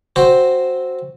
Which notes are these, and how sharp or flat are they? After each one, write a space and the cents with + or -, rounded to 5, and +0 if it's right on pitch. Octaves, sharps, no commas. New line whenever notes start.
C4 +0 F#4 -5 C5 +0